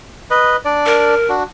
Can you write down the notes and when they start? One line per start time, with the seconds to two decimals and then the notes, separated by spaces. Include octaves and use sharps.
0.31 B4 D#5
0.65 D4 D5
0.86 A#4
1.29 D4 F#4